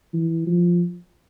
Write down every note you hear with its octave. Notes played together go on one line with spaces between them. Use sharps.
E3
F3